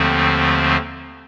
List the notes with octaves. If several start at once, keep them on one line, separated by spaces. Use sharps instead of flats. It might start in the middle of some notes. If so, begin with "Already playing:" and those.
Already playing: D#2 D3 F3 A3 C4